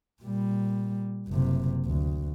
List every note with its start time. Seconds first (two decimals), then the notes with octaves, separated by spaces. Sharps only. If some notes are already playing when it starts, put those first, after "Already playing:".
0.22 A#2 G3
1.28 F#1 C3
1.86 D2